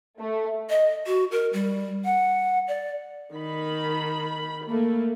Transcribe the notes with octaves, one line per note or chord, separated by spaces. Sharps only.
A3
D#5
F#4
A#4
G3
F#5
D5
D#3 B5
A3 A#3